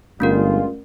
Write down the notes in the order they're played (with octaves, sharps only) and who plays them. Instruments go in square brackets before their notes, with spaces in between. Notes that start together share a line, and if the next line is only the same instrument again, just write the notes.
[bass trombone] G1 [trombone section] G2 G#3 F4 [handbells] A3 C#4 A#4